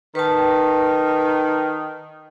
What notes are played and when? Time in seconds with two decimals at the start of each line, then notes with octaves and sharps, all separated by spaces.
0.15 D#3 B4 A5